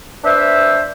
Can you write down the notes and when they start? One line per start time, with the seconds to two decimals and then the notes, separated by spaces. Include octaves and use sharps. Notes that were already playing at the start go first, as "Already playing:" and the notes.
0.24 D4 B4 C5 E5